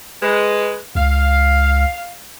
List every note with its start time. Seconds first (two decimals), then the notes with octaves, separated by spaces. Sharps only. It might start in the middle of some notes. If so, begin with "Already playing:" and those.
0.22 G#3 B4
0.95 C#2 F5